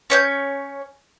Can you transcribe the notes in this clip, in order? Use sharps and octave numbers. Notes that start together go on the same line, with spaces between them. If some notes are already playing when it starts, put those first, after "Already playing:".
C#4 C#5 F#6 G6